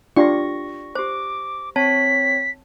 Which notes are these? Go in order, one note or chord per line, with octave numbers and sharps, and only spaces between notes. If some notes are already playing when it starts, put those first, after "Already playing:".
D4 F4 G4 D5 G5 C#6 A#6
G4 C5 D6
C4 C#5 A5 B6